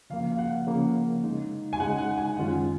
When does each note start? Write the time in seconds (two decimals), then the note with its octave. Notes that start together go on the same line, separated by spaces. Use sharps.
0.10 C#3 F3 A#3 F5
0.32 F5
0.39 F#5
0.67 C#3 F3 A#3
1.24 C#3 G#3 D#4
1.73 G#5
1.80 C#3 G#3 D#4 F#5
1.98 F#5
2.18 G#5
2.37 F#2 D#3 G#3 C#4 F4 F#5